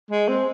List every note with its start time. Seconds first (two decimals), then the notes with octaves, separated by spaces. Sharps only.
0.11 G#3
0.29 C4